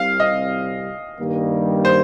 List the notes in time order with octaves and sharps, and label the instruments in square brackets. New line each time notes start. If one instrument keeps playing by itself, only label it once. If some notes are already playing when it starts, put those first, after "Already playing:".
Already playing: [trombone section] C2 C3 G3 C4 [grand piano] F5
[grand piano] D#5
[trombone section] G2 D#3 G3 A#3
[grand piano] C5